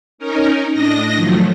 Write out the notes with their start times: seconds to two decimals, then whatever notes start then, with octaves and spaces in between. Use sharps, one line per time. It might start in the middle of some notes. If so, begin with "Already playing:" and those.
0.18 C#4 D#4 A#4
0.72 A2 D4 D#5 A#6
1.15 D#3 F3 F#3 A3